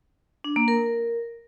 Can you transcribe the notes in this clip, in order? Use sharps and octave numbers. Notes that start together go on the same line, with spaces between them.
D4
A#3
A#4